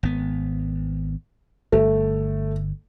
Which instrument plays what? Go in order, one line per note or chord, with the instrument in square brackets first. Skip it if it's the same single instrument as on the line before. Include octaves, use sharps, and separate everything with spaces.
[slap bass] G#1 B3
[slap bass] G1 [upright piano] A3